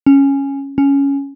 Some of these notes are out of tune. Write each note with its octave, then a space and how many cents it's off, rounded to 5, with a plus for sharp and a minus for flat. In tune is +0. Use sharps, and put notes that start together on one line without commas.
C#4 -5
C#4 +5